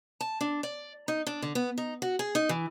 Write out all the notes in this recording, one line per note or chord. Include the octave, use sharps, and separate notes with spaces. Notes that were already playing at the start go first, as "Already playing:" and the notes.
A5
D4
D5
D#4
D4
D3
B3
D#4
F#4
G#4
D#4
E3